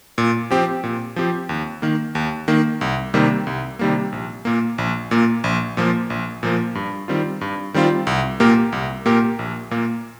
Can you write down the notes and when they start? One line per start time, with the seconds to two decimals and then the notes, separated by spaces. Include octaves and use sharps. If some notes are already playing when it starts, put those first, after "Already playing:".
0.18 A#2
0.50 F3 C4 G4
0.84 A#2
1.16 F3 C4 G4
1.49 D#2
1.82 D#3 A#3
2.15 D#2
2.48 D#3 A#3
2.81 C2
3.14 C3 D#3 G3 A#3
3.47 C2
3.79 C3 D#3 G3 A#3
4.12 A#1
4.45 A#2 A#3
4.78 A#1
5.11 A#2 A#3
5.44 A#1
5.77 A#2 F3 A#3
6.10 A#1
6.43 A#2 F3 A#3
6.75 G2
7.08 D#3 G3 C4 F4
7.41 G2
7.74 D#3 G3 C4 F4
8.07 C2
8.40 A#2 A#3 G4 A#4
8.72 C2
9.05 A#2 A#3 G4 A#4
9.39 A#1
9.71 A#2 A#3